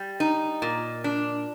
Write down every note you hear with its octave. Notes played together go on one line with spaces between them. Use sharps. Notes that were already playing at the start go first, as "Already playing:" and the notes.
Already playing: G3
D#4
A#2
D4